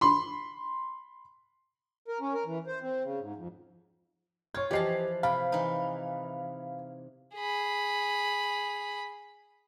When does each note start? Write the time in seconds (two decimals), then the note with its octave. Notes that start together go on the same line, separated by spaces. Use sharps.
0.01 B5 C6
2.08 A#4
2.20 C#4
2.34 A#4
2.46 E3
2.67 C5
2.81 C4
3.04 C#3
3.20 G#2
3.36 F2
4.54 F4 C#5 G#6
4.71 E3 F3 G4 D#5 A5 C7
5.23 C3 F5 B5
5.52 E3 D#4
7.34 G#4 B5